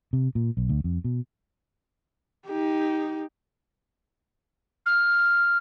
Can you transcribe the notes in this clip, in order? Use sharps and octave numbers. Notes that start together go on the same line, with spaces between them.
C3
A#2
B1
D2
F2
B2
D#4 G4
F6